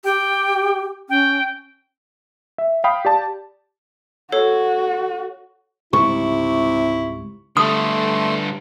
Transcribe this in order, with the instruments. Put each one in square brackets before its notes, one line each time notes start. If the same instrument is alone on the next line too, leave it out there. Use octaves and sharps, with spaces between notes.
[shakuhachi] G4 [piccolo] G5
[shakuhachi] C#4 [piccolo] G5
[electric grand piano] E5
F5 G5 B5 D#6
G4 D5 A5
[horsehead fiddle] F#4 [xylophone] A4 C#5
[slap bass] C#2 G#2 G3 [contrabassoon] C3 [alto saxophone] E4 [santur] C#6
[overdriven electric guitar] D3 G3 [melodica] A3 C6 [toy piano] D#6